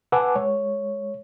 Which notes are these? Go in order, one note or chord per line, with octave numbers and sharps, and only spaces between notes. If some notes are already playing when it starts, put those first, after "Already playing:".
B4 F#5 G#5 A5 D6 E6
G#3 C#5